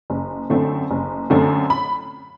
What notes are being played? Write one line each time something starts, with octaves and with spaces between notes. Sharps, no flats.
F#1
F#2 D3 A3 C4
F#1
F#2 D3 A3 C4
B5